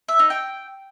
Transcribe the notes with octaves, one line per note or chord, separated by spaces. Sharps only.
E5
D#4
G5